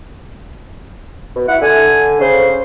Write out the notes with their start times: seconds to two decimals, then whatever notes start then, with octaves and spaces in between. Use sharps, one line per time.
1.36 B2
1.48 E4 F#5
1.61 D3 G#5
2.20 C#3 C5